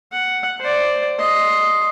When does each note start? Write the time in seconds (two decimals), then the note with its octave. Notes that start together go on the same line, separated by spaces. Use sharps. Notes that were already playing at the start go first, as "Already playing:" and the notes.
0.12 F#5
0.61 C5 D5
1.19 D#5 C6